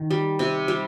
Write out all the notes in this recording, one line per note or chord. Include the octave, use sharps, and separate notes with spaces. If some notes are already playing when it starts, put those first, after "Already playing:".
Already playing: D#3
G3
C3
G3